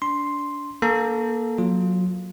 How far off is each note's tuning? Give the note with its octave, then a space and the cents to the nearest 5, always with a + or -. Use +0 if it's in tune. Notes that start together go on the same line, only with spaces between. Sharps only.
D4 -20 C6 +0
A#3 +15 A4 -15 A#5 -10
F#3 -20 F4 +0